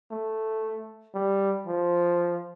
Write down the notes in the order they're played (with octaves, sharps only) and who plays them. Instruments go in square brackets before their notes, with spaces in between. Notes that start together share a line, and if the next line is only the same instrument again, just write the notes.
[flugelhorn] A3
G3
F3